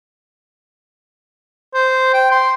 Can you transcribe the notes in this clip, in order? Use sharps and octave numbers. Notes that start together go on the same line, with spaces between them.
C5
G5
C6